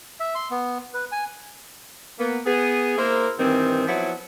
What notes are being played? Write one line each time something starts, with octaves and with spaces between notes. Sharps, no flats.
E5
C6
B3
B4
G#5
A#3 B3
B3 G#4
A#3 E4 A#4 C5
G2 D#3 E3 C4
F3 F#3 B3 E4